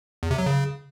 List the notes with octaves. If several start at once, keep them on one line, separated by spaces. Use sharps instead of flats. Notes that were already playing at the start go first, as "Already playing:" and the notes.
E2
C3
F#3
C#3